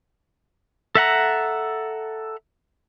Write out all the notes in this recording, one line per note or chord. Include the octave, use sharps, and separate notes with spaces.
A4 E5 F#5 A#5